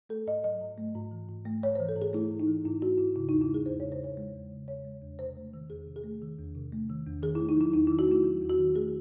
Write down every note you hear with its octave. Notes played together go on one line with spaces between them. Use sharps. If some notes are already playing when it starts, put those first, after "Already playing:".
A3 A4
G#2 D#5
F#3 D#5
G#2
A3
G#2
E3
G#2
A3
G#2 C#5
E3 C5
A4
G#2
G#4
A3 E4
G#2
D#4
E3
G#2 E4
A3 F#4
G#2 E4
C#3 E4
E2 D#4
E4
G#3
G#4
E2 C5
C#3 C#5
C5
E2 C#5
G#3
E2
C#3
E2 C#5
G#3
E2
C3 C5
A3
D#3
E2 G#4
C3
G#4
A3
D#3
E2
C3
A3
D#3
E2
D#3 G#4
A3 E4
D#4
F#3 E4
E2 D#4
D#3 E4
F#4
A3 E4
F#3
E2
F#4
D#3
A3 G#4